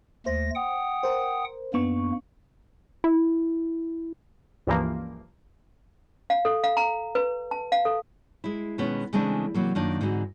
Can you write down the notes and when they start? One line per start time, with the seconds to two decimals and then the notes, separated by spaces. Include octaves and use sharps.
0.26 D#2 A3 C5 A#6
0.55 F#5 G5 D#6
1.03 A#4 C5
1.74 F#2 A#3 B3 D4 C#6
3.04 E4
4.67 C#2 G2 E3 F3 A#3
6.30 F5
6.45 A4
6.64 F5
6.77 A#5
7.15 B4
7.51 A5
7.72 F5
7.85 A4
8.44 G#3 E4
8.78 B2 D#3 G#3 B3 C#4
9.13 C#3 E3 G#3 A3 C4 D4
9.54 C3 E3 F#3 A#3
9.75 F#2 D#3 A#3 D4 F4 D#5
10.01 G#2 D3 E3 C4 D#4 F#4